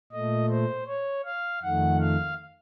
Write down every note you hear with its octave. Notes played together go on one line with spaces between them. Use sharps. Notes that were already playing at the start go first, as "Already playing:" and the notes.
A#2 A3 D#5
C5
C#5
F5
F2 D#3 A3 F#5
F5